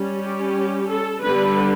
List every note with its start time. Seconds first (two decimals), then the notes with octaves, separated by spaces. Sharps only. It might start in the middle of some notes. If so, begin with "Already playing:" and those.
Already playing: G3 C#4
0.21 G4
0.89 A4
1.22 D3 G3 B3 B4